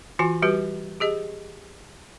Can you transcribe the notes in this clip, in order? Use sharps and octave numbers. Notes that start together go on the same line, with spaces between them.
E3 F4 F#4 G#5
G3 F#4 G4 B4
G4 G#4 D#5